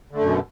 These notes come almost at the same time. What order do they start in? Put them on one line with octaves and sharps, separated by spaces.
D3 A3 F#2 B2